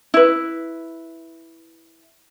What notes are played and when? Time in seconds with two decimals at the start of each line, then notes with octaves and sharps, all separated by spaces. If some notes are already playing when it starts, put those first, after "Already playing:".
0.14 E4 B4